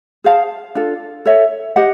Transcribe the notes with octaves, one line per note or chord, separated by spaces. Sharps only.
G#4 C5 F5 A5
D4 F4 A4
A4 C#5 E5
G4 C5 D#5 F#5